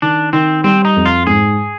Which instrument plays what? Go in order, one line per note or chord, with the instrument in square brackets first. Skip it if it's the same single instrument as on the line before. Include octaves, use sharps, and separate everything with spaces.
[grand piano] D#3 [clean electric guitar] D4
[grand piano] D#3 [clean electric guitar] C4
[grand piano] G3 [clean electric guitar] C4
[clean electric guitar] D#4
[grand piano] F2
[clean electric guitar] F4
[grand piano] G#2 [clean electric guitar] G#4